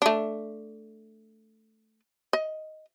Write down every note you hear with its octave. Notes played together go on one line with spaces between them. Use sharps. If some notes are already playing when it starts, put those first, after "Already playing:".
A3 D4
D#5